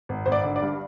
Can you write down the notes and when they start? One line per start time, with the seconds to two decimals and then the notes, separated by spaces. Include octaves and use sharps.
0.09 G#1
0.26 G#1 C5
0.32 D5
0.44 D3
0.56 D5
0.62 G2